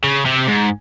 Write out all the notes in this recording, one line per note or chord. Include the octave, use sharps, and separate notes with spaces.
C#3
C3
G#2